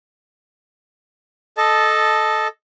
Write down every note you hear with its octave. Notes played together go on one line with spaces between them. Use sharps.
A4 D#5 A5